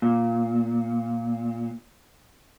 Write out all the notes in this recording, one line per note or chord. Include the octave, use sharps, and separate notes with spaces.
A#2